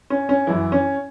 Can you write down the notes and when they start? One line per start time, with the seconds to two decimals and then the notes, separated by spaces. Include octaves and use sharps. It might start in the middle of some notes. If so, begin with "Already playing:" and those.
0.10 C#4
0.29 C#4
0.47 F#2 E3 E4
0.72 C#4